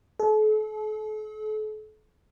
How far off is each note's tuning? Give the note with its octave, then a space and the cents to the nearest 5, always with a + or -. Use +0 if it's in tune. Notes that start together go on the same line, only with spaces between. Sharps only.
A4 -40